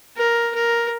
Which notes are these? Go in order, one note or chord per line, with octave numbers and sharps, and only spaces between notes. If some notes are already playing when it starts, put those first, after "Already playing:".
A#4
A#4